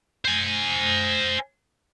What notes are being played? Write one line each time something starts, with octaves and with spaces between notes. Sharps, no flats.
C5 G#5